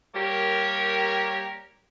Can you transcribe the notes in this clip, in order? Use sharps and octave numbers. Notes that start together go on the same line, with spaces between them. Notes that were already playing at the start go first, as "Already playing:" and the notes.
G3 A#3 G4 A#4 C#5